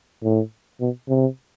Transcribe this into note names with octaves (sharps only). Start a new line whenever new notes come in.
A2
B2
C3